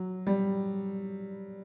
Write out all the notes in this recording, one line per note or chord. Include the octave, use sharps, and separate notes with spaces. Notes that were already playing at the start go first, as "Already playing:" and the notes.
Already playing: F#3
G3